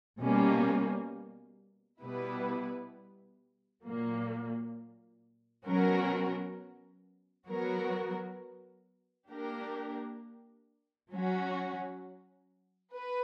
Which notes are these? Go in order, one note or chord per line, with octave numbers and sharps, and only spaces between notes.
B2 G3 A#3 C#4
B2 G3 B3 E4 B4
A#2 F#3 A#3
B2 F#3 C#4 F#4 A#4
F#3 B3 F#4 A#4
A#3 D4 G4 A#4
F#3 C#4 F#4
B4